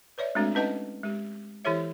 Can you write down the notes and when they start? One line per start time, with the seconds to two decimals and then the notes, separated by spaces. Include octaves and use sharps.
0.18 B4 C#5 D5 E5
0.35 G#3 A3 C4 D4 F#4 A4
0.55 C#4 D#4 B4 D#5 F#5 A5
1.03 G#3 G4
1.65 E3 E4 G4 A4 C#5 E5